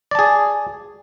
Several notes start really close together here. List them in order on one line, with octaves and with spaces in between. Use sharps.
D5 A5 G#4